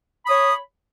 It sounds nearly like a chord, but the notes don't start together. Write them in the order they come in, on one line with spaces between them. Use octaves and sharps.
B5 D#6 C#5